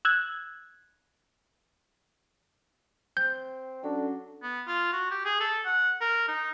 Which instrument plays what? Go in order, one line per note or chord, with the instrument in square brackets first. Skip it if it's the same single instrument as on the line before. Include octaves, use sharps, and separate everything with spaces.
[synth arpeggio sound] E6 F#6 G#6
[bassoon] C4 [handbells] G6
[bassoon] F#3 [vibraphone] C#4 A4 [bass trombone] D4
[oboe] B3
F4
F#4
G4
G#4
A4
F#5
A#4
D#4